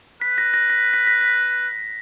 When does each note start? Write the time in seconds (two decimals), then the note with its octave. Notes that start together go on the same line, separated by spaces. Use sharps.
0.21 B4 B6
0.38 A#6
0.54 A#6
0.70 A#6
0.94 B6
1.07 A#6
1.21 B6